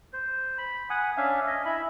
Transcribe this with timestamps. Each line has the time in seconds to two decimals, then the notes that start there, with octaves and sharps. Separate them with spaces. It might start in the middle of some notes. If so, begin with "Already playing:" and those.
0.13 C5
0.58 B5
0.90 F#5 G#5 D#6
1.17 C#4 D4 E5 F5
1.47 D#5 G#5
1.65 E4 E5 B5